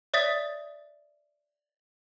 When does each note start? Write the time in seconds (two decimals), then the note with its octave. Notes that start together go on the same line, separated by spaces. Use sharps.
0.14 C#5 D5 E5 D#6 A6 B6